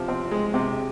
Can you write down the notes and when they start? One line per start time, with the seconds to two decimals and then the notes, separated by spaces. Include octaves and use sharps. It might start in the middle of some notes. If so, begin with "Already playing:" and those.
Already playing: C3 F3
0.08 C4
0.31 G#3
0.54 C3